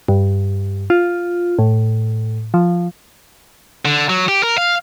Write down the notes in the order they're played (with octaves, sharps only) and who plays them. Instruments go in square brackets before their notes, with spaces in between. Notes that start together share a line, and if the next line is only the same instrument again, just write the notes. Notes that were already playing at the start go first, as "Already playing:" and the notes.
[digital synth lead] G2
F4
A2
F3
[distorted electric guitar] D3
F#3
G4
A#4
F5